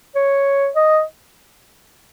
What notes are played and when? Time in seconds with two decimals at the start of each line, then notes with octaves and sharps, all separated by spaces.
0.16 C#5
0.76 D#5